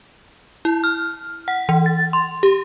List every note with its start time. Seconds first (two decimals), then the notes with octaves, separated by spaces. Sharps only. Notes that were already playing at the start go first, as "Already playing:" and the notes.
0.65 E4
0.84 F6
1.48 F#5
1.69 E3
1.86 A6
2.13 C6
2.43 G4